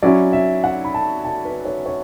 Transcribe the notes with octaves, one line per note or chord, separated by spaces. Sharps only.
F#3 C#4 E4 D5
E5
F#5
B5
A5
A5
B4
C#5
C#5